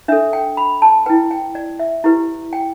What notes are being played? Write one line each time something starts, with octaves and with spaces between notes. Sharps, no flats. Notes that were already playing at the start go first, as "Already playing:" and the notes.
D4 A4 E5
G5
B5
A5
E4 B4 G5
G5
D5
E5
E4 G4 B4
G5